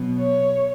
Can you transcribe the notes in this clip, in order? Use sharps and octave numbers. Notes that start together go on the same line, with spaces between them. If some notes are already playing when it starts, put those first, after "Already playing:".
Already playing: B2 F#3 B3
C#5